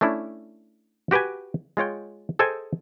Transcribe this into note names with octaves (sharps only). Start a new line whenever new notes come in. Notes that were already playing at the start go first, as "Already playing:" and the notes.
A3 C#4 D4 E4
F#4 G4 B4 G5 G#5
G#3 F4 C#5 G5
G#4 A4 C5 D#5 G5 G#5